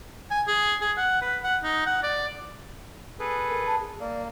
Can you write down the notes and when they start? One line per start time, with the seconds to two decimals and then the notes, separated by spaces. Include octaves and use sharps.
0.31 G#5
0.47 G#4
0.81 G#4
0.97 F#5
1.21 B4
1.44 F#5
1.63 D#4
1.86 F#5
2.03 D5
3.20 G#4 A4 B4
3.48 A#4
3.65 A5
3.79 G#4
4.00 A#3 D5